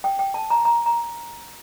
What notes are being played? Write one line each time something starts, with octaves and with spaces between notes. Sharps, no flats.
G5
G5
A5
A#5
A#5
A#5